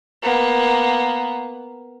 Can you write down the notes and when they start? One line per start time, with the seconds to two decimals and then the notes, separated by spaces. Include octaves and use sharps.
0.23 A#3 B3